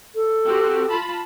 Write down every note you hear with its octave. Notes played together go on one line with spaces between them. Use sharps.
A4
C4 F#4 G4
F4 A5 B5